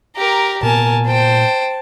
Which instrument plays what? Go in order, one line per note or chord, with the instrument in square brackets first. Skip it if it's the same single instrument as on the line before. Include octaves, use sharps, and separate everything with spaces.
[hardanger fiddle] G4 A#4 [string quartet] A#5
[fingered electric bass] A#2 B3 [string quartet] A#4 G#5 [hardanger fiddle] A5
[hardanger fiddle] C5 G5 [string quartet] A5